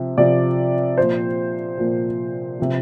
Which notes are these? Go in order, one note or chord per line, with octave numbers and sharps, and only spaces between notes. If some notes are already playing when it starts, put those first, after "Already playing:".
Already playing: C3 F3
C3 F3 D5
A#2 F3 C5
A#2 F3
C3 F3